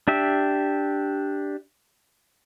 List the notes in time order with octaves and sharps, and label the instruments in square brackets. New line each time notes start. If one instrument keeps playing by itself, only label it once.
[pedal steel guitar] D4 G4 E5